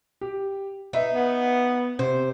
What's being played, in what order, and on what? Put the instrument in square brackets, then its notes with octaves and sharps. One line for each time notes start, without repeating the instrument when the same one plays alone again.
[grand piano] G4
[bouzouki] D#4 [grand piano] B4 E5
[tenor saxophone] B3
[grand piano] C3 [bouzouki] C5